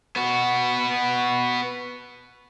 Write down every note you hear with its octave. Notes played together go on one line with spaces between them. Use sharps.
B3 F#4